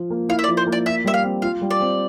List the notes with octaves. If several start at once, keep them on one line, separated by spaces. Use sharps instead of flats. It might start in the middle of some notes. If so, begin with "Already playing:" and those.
Already playing: F3 F4
A#3
E4 F5
E5
D5
F3
C5
A#3
D5
F4 E5
G3 E5
F5
C4
F4 F5
G3
D5
C4